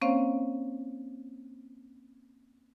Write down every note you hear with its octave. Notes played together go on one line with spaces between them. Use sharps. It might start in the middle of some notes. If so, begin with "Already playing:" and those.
A#3 C4 C#4 C5 C#5 F5